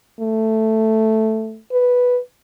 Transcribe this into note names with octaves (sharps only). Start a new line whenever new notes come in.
A3
B4